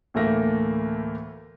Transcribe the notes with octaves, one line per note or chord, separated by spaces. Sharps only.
D2 A2 E3 A3 A#3 A#6